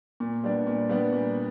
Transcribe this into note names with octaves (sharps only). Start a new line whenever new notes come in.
A#2
G3 B3 D4
A#2
G3 B3 D4
A#2